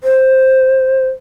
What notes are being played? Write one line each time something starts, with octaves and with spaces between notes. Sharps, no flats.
C5